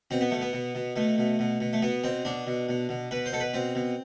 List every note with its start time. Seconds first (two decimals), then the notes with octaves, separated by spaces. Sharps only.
0.11 B2 C4
0.21 B3
0.31 B2 A3
0.42 B3
0.53 B2
0.75 B2
0.96 B2 A3
1.18 B2
1.39 B2
1.60 B2
1.73 A3
1.82 B2 B3
2.04 B2 C4
2.25 B2 D4
2.47 B2
2.69 B2
2.89 B2
3.11 B2 B4
3.26 C5
3.32 B2 A4
3.40 B4
3.54 B2 C4
3.75 B2